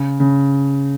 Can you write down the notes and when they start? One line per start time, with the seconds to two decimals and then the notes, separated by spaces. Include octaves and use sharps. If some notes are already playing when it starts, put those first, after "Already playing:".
Already playing: C#3
0.20 C#3